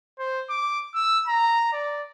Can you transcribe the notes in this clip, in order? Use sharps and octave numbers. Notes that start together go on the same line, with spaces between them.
C5
D6
E6
A#5
D5